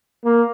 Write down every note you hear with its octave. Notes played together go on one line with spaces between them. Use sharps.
A#3